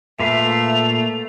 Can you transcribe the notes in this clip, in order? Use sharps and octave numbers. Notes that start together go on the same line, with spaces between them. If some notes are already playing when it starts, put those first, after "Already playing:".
A#2 A3 B4 E5 F5 F7